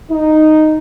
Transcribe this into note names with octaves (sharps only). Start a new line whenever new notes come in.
D#4